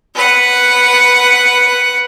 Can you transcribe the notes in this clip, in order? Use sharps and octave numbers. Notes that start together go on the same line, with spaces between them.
B4 F#5